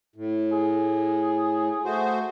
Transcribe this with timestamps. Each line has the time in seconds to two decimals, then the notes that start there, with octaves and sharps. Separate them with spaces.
0.16 A2
0.52 G#4
1.85 A3 F#4 C5